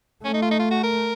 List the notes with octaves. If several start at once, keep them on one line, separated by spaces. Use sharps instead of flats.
A3 C#4
D#4
F4
D#4
F4
F#4
A#4